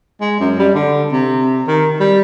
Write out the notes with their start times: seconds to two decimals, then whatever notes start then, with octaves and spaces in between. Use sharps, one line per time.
0.21 G#3
0.40 F#2
0.59 G3
0.74 D3
1.12 C3
1.67 D#3
2.00 G3